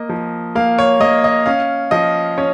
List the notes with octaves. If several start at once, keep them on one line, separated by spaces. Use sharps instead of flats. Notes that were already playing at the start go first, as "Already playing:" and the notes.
Already playing: A#3 D#5
F3
A#3 F5
C#5
A#3 D#5
D#5
C#4 F5
F3 D#5
C#4 C#5